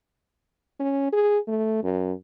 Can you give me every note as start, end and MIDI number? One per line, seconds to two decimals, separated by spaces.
0.80 1.11 61
1.12 1.39 68
1.48 1.82 57
1.83 2.13 42